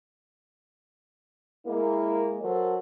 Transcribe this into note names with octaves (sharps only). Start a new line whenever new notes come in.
G#3 A#3 E4
F#3 A4 A#4 C5